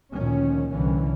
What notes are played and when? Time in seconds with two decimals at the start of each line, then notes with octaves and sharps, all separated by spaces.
0.12 D2 A#2 D#3 F3 C#4
0.70 C2 D3 E3 C#4